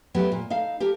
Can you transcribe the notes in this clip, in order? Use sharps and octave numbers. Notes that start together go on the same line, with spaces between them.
F#3 A3 B3 G4
A#2
D#4 A4 F5
G4 A4 A#4